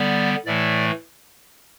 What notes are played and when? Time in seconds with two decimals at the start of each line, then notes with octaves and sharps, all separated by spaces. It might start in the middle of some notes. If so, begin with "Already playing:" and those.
Already playing: D3 G3 B3 D5
0.46 A2 E3 A3 D5